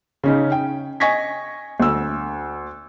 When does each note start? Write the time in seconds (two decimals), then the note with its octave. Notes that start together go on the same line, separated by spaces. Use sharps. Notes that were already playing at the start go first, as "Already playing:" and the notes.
0.23 C#3 C#4 D#4
0.52 G5
1.00 D#5 G#5 C#6 G#6 A#6 B6
1.80 D2 E6